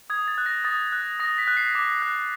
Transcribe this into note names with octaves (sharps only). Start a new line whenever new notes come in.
D#6 G#6
A6
F#6
A#6
D#6 A6
F#6
D#6 A#6
B6
F#6
C7
D6
F#6